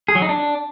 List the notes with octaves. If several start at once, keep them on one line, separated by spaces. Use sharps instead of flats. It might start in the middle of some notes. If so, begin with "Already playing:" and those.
G#4
F#3
D#4
D4